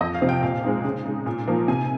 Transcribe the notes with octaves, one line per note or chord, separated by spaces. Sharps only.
F2 D#5
F5
C3 F3 C4
G5
A#2 F5
G#3 C4 D#4
C#3
G#3 D#4
A#2
F3 A#3 D#4
C3 G#5